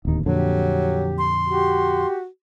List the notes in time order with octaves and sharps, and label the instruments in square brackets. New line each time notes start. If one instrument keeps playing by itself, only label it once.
[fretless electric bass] D1 D#2 [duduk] D#4
[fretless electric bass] F2 A#2 D3 [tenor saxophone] F#3 [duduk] G4
[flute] C6
[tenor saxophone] F#4 [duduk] G4